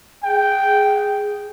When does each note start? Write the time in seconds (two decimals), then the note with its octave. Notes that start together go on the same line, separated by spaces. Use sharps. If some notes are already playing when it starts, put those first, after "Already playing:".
0.24 G#4 G5